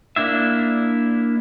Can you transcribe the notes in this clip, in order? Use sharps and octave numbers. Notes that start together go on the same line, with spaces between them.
A#3 D4 E4 E5